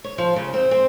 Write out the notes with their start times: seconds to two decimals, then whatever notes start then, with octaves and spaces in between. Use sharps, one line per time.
0.04 C#5
0.18 F3
0.36 C#3
0.54 C4
0.71 C4